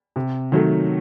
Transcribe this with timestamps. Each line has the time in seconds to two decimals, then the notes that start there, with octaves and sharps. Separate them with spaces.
0.16 C3
0.52 D#3 F#3 A3